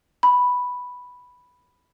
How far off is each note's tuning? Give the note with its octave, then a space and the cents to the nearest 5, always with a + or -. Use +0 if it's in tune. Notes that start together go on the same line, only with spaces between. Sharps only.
B5 +0